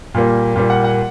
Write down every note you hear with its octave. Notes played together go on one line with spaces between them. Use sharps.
A#2 G3 A#3
A#2 G3 A#3
F#5
F#5